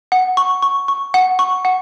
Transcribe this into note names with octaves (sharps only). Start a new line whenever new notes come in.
F#5
C#6
C#6
C#6
F#5
C#6
F#5